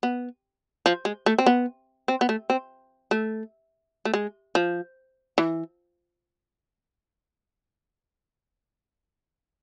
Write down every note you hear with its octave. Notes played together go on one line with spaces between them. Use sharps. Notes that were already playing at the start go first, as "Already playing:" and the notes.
B3
F3
G#3
A3
C4
B3
C4
B3
A3
C4
A3
A3
G#3
F3
E3